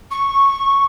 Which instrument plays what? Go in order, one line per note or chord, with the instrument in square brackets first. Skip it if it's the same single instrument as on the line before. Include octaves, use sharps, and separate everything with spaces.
[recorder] C#6